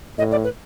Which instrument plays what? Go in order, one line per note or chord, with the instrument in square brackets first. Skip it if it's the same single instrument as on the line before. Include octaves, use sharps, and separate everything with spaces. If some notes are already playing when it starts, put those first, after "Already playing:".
[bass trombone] A2 [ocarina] D#5
[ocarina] D5
B4